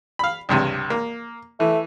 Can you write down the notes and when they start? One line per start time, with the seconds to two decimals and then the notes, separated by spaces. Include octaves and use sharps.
0.19 F5 B5
0.49 C#2 G2 C3
0.90 A#3
1.60 E3 A3